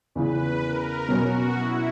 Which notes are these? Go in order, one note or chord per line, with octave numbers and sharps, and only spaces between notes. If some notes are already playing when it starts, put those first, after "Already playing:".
E2 C#3 E3 B4
A#4
B2 F#3 C#4 F#4
E4